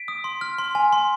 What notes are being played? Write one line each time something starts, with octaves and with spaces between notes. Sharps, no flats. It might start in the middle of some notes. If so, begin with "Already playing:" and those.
Already playing: B6 D7
D#6
C6
F6
C6
G#5
C6